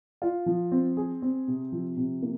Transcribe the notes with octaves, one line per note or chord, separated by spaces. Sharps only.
F4
F3
C4
G#4
C4
C3
F3
C3
A#3